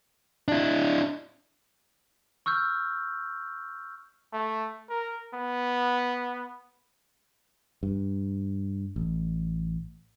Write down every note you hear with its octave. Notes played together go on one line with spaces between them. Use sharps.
D4 E4
C#6 E6 F6 G6
A3
A#4
B3
G2
A1